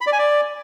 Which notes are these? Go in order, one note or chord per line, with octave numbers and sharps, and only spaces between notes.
B5
D5
G#5
D5